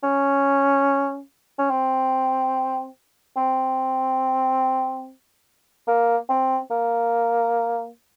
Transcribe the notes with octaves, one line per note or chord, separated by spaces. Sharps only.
C#4
C#4
C4
C4
A#3
C4
A#3